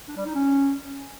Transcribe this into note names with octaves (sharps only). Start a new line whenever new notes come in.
D4
G3
D#4
C#4